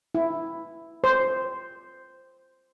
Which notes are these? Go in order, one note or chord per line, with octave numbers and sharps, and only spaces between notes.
E4
C5